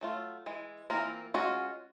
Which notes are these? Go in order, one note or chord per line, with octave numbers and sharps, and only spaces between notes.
F#3 A3 F4
E3 G#3
E3 A3 A#3 C4 F4 A#4
G#3 C#4 F4 F#4